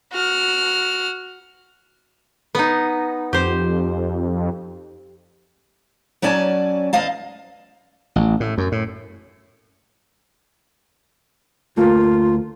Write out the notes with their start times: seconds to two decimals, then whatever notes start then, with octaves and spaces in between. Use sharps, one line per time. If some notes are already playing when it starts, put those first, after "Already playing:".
0.12 F#4 F6
2.55 B3 D#4
3.33 F2 G4 C5
6.22 F#3 C#4 D5 G#5 A5
6.93 E2 D#5 F5 A5
8.16 A1
8.40 A2
8.58 F#2
8.72 A2
11.77 D2 A3 A#3 F4